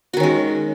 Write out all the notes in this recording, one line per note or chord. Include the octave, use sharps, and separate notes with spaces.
D#3 G#3 C#4 F#4